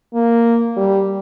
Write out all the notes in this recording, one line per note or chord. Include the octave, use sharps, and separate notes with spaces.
A#3
G3